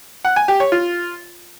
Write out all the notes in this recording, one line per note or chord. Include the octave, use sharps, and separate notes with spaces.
F#5
G#5
G4
C#5
F4